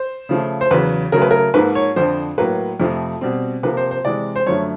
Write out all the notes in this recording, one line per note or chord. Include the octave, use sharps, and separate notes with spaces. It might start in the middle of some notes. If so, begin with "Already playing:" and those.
Already playing: C5
C#3 F3 A3
C5
E2 C#3 F#3 B4
C#3 F#3 A3 A#4
B4
A#4
G#2 F3 A#3 B4
C#5
F2 D3 F3 C5
A2 F#3 A#3 B4
F2 C3 F3 A3
B2 G3 C4
C3 F3 A#3 B4
C5
C5
C3 E3 G#3 D5
C5
F#2 D3 F3 A3 C#5